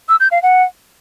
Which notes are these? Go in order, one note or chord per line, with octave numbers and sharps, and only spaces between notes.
E6
G6
F5
F#5